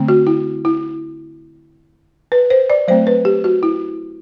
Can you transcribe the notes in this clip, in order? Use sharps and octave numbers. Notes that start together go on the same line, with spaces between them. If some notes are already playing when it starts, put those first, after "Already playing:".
Already playing: D3 A3 C4
F#4
E4
E4
B4
C5
D5
F#3 A3 C4 C5
B4
G4
F#4
E4